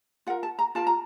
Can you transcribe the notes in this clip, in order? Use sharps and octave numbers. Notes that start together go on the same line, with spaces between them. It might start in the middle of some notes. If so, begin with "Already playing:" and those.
F4 A#4 F#5
A5
A#5
F4 A#4 A5
A#5